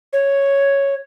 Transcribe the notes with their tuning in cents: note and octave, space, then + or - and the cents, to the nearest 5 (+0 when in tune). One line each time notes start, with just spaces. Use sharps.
C#5 +0